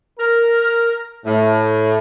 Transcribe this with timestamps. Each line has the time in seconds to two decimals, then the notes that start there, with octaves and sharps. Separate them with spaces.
0.19 A#4
1.25 A2